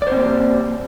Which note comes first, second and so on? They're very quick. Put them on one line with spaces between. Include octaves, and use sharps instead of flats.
D5 C5 C4 A#3 G4